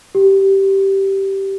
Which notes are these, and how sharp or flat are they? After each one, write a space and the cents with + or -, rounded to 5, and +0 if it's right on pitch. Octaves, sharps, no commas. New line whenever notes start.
G4 -10